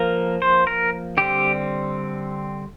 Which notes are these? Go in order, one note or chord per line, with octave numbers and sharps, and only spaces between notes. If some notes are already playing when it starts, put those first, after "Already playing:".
Already playing: F3 A#3 A#4
C5
A#4
D3 G3 C4 G4